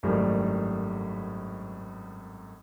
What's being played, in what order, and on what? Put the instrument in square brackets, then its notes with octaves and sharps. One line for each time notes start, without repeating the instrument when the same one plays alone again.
[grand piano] G#1 F#2 A2 D#3 G3